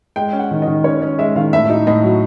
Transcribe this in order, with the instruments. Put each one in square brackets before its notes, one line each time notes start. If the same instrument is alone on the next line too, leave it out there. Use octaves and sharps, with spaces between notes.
[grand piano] G#3 [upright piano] G5
[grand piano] C#4
[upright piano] F#5
[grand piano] D#3
[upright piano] D#5
[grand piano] D#3
[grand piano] C#4 [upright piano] C#5
[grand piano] C#4 [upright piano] D#5
[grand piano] G#3 [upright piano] E5
[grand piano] D#3 [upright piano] F5
[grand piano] A2 [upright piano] E5
[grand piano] D#4
[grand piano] A2 [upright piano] D#5
[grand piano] F#3